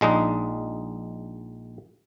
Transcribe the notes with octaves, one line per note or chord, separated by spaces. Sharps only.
A#1 G#3 D4 D#4